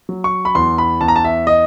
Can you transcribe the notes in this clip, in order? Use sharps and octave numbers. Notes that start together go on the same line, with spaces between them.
F#3
C#6
B5
E2 C6
B5
E2 A5
A#5
A5
E5
D#5